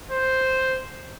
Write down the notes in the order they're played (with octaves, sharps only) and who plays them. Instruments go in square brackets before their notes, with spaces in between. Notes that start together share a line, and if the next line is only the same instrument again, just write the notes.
[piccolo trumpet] C5